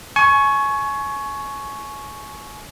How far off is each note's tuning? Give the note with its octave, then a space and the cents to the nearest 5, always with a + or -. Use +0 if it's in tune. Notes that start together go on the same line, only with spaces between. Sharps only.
G#5 +30 C#6 +0